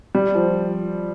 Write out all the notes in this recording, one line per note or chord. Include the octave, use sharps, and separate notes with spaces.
G3
F3